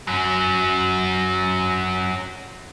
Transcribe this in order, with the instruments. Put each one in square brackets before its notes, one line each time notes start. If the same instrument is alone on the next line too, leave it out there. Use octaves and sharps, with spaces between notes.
[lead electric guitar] F#2 F#3